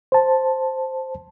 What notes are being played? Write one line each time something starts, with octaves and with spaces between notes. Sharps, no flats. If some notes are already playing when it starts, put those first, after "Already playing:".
C5 A5